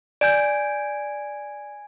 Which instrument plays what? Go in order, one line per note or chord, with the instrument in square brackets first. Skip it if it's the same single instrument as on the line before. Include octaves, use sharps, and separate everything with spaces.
[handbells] D5 G6 [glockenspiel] G#5 G#6 D7